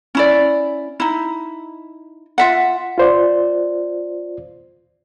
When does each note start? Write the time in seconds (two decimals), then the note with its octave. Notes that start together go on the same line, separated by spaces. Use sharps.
0.15 C#4 E4 D5
1.00 D#4 E4
2.38 F4 E5 F#5
2.98 F4 C5 D5